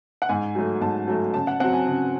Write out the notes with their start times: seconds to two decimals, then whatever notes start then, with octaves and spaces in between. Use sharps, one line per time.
0.22 F#5
0.29 G#2 G#5
0.55 F#3 A3
0.81 G#2 A5
1.08 F#3 A3
1.34 C#3 A5
1.47 F#5
1.60 F#3 C4 F#5
1.73 G#5
1.87 C#3